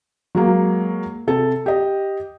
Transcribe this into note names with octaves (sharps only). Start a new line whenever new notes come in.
F#3 G#3 A#3
C3 A4
G4 D#5